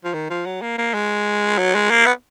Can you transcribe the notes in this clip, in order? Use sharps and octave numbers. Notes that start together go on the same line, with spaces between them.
F3
D#3
F3
F#3
A#3
A#3
G#3
F#3
G#3
A#3
B3